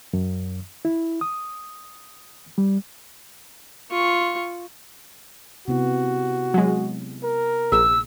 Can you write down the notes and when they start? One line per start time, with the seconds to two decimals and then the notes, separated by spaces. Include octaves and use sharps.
0.13 F#2
0.85 E4
1.21 D#6
2.58 G3
3.91 F4 C#6
5.68 C3 B3 E4 F#4
6.54 F#3 G#3
7.24 A#4
7.72 A#1 G#4 E6